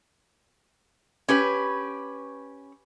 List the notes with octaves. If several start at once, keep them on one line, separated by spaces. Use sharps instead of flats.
C#4 G4 B4